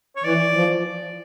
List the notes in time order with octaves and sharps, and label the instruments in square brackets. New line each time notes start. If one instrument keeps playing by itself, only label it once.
[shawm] C#5
[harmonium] E3 [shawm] D5
[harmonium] F3